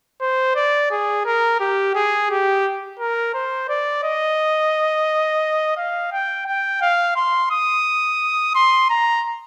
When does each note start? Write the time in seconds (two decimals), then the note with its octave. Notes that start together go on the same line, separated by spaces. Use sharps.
0.22 C5
0.56 D5
0.91 G#4
1.26 A#4
1.60 G4
1.95 G#4
2.30 G4
2.99 A#4
3.34 C5
3.69 D5
4.03 D#5
5.77 F5
6.12 G5
6.47 G5
6.82 F5
7.16 C6
7.51 D#6
8.55 C6
8.90 A#5